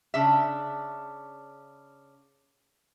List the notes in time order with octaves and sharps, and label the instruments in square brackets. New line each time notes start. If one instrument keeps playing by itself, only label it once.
[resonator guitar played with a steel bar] C#3 D4 E5